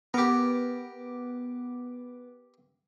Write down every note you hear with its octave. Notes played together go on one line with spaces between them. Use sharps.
B3 G4 A#4 D6